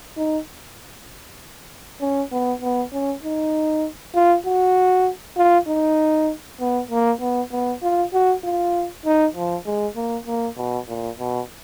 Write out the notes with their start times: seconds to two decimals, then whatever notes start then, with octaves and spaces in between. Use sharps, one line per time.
0.17 D#4
2.01 C#4
2.32 B3
2.62 B3
2.93 C#4
3.23 D#4
4.15 F4
4.46 F#4
5.37 F4
5.68 D#4
6.60 B3
6.91 A#3
7.21 B3
7.52 B3
7.82 F4
8.13 F#4
8.44 F4
9.05 D#4
9.35 F3
9.66 G#3
9.96 A#3
10.27 A#3
10.57 B2
10.89 A#2
11.19 B2